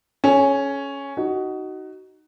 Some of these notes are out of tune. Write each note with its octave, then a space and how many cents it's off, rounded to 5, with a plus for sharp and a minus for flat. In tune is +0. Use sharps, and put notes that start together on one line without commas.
C#4 +0 A4 -45
D#4 +0 F#4 +20